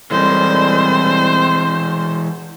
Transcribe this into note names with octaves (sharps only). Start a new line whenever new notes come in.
D#2 A2 E3 G3 G#3 C4 C5